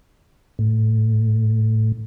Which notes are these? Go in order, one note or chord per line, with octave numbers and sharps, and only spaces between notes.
A2